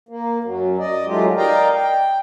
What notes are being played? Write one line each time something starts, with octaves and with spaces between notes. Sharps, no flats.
A#3
F#2 F#3
D5 D#5
D#3 F#3 G#3 A3 F4 G4
A#4 D5 D#5 F5 G5 A#5
G5